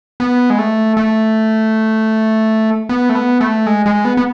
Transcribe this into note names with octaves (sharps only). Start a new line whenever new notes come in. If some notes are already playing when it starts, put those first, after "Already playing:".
B3
G#3
A3
A3
B3
A3
B3
A3
G#3
G#3
B3
B3